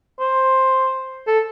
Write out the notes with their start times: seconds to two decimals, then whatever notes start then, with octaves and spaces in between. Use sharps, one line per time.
0.20 C5
1.27 A4